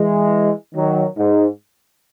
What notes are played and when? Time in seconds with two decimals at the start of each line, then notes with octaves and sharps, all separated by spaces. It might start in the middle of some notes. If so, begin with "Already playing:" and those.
Already playing: E3 G#3
0.75 D#3 F#3
1.16 G#2